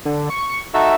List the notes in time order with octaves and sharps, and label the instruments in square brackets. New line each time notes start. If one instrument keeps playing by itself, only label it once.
[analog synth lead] D3
C#6
[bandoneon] D#4 F#4 A4 [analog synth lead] E5